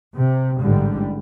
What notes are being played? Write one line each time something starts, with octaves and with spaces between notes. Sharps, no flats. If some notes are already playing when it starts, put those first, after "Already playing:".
C3
A1 G#2 D3 G3